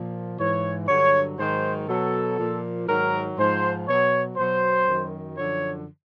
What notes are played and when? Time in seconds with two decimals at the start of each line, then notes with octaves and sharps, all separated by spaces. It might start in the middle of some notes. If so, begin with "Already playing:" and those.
Already playing: A#2 F3
0.38 G#2 E3 C#5
0.88 G2 D3 F#3 C#5
1.38 G#2 D#3 F#3 C5
1.88 B2 F#3 A4
2.38 A#2 F3
2.87 G#2 D#3 F#3 A#4
3.37 G#2 F3 C5
3.87 B2 F#3 C#5
4.36 B2 F#3 C5
4.86 F#2 D#3 F#3
5.36 F#2 D3 F3 C#5